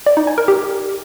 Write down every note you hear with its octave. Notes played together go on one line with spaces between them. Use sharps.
D5
D#4
G#5
A#4
G4